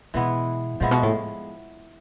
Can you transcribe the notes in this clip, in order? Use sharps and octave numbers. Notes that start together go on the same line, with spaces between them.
B2 E3 G#3 B3 E4
A#2 F3 G#3 B3 E4
B2
A2